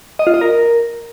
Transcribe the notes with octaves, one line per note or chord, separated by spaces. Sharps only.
D#5
F4
D#5
A#4